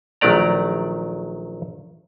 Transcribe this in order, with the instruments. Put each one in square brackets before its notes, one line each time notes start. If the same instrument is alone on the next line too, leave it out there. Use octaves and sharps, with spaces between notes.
[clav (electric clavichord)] A#1 D#3 F#3 A3 D5 A#5